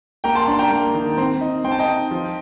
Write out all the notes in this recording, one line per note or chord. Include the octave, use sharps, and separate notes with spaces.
A#3 G5 A#5
A5 C6
D4 A5 C6
G5 A#5
A#3
D#3
C4
D#4
C4 G5
A5
D#5 G5
D#4
F3